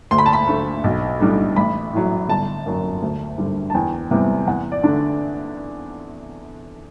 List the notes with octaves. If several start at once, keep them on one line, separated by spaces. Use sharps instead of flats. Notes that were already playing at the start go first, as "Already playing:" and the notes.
D2 C6
B5
A5
B5
D3 A3
B1
A2 G3 D4
A1 B5
A2 F#3
G1 A5
F#2 F#3
D2
D3 G3 D4
A5
E2 G5
C3 E3 G3 B3
E2 F#5
D5
D3 A3 D4